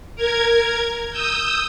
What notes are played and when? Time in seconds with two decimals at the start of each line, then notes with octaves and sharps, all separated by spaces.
0.16 A#4 G#6
1.11 D#6 E6 G6